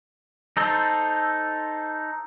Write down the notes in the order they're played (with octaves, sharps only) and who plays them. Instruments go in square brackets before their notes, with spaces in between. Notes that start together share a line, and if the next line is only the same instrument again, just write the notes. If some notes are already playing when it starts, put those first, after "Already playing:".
[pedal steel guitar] D#4 A4 C5